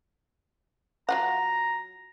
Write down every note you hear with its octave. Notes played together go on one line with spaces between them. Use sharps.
F#3 F4 F#5 A#5